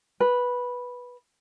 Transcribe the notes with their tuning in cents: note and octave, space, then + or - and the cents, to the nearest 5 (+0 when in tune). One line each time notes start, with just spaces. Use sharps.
B4 -10